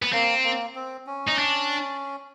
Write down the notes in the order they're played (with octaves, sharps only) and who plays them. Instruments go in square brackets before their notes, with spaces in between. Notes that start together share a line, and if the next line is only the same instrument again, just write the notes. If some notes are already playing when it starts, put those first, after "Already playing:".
[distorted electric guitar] B3
[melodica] A#3 [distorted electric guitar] C4
[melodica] A#3
C4
C#4
[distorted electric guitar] D#4
D4